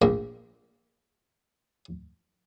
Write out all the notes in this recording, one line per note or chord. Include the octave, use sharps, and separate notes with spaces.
A#1 A#3